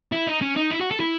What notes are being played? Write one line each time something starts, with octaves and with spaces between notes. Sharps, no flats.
E4
D#4
C#4
D#4
E4
F#4
A4
E4